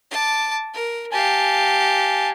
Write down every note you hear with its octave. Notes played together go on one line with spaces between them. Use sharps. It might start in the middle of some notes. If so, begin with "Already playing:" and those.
A5 D6
A#4
G4 F5 G#5 A5